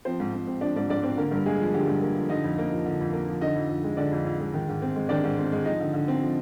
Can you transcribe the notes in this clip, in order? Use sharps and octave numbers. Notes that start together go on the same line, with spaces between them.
F3 C4 C5
G#2
G#2
C4
F3 D4 D5
G#2 D4 D5
G#2 D4 D5
C4 C5
D3 A#3 A#4
G2 A#4
G#3 A#3 G#4
F3
D3 G4
G2
A#3
F3
D3 D#4 D#5
F2
A#3
F3
D3
F2
A#3
F3
D3 D#4 D#5
F2
F2
G#3
D3 D4 D5
F2
F2
G#3
D#3
G#2
C4
G#3
D#3 D4 D5
G#2
C4
G#3
F3 D#4 D#5
D3
D3
C4
F3